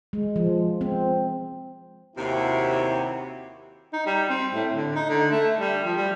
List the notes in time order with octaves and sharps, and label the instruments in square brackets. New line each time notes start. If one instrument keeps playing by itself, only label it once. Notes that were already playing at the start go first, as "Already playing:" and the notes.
[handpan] G#3
F3
C4
[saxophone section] D#2 C3 [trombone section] E4 F#4 G4
[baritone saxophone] D#4
G3
C4
A2
D3
D#4
D3
A3
G3
F3
G3